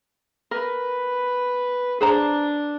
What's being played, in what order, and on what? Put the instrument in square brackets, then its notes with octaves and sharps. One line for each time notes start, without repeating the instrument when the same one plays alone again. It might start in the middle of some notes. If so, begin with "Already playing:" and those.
[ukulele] A#4 [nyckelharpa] B4
[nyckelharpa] D4 [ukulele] G#4 C5 A#5